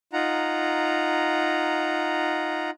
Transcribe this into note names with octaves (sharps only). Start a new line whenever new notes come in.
D#4 F4 F#5 A#5